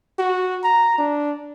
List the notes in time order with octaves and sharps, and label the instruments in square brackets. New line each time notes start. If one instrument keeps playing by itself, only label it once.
[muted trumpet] F#4
A#5
D4